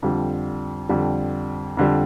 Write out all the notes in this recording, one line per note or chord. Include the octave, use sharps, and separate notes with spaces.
F2 D3 G3
F2 D3 G3
F2 D3 G3